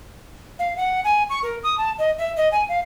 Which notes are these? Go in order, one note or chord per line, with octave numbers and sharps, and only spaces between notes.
F5
F#5
G#5
C#6
A#4
D#6
A5
D#5
E5
D#5
G#5
F5